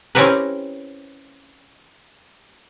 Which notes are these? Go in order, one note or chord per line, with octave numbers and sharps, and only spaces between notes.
C4 C#4 E4 G4 A#4 B4